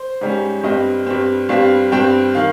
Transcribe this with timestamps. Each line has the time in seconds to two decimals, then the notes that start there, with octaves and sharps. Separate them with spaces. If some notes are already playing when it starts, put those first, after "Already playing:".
Already playing: C5
0.21 G#2 G3 C#4
0.63 G2 G3 C4 D#5
1.07 G2 G3 C4
1.49 G2 G3 C4 F5
1.92 G2 G3 C4 G5
2.35 D#3 F5